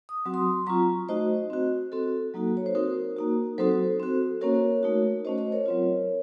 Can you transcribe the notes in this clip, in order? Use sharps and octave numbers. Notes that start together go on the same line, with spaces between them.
D#6
F#3 C4 F#4
C6 D#6
F#3 C4 F4 A#5 C#6
A3 D#4 F#4 C5 D#5
C4 F#4
C4 F#4 A4
F#3 A#3 D#4 F#4
C#5
C5
C4 D#4 F#4 A#4
A#3 D#4 F#4
F#3 C4 D#4 F#4 A4 C5
C4 F#4
A#3 C#4 F#4 A#4 C#5
A3 D#4 F#4
A3 C#4 F#4 C5 D#5
C5 D#5
A#4 C#5
F#3 C4 F4